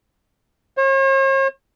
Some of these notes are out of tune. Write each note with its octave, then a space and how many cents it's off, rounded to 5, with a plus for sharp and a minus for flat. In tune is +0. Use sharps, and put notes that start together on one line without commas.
C#5 -45